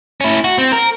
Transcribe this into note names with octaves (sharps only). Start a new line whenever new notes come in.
C#4 E4
F#4
C4
A#4